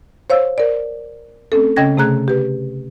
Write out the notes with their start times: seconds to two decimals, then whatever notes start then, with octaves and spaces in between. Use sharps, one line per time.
0.30 C5 C#5 F5 E6
0.58 A#4 D5
1.52 A3 C4 C#4 A4
1.76 C#3 C#4 D#5 G5 G#6 A#6
1.97 C3 A3 G#4 A#5 F#6 G#6
2.28 G4 B4